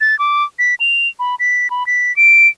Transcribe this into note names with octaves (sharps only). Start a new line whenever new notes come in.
A6
D6
B6
F7
B5
B6
B5
B6
D7